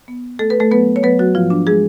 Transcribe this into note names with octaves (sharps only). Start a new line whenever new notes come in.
B3
A3 A4
B4
A3 A4
F#3 B3 B4
C#5
F#3 B3 B4
F#3 F#4
G#2 F3 F4
D4
G#3 G#4